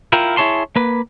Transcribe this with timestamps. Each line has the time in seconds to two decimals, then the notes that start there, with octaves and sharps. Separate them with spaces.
0.13 E4 F4 A#4 G5
0.37 E4 G#4 C#5 A5 C6
0.76 A#3 B4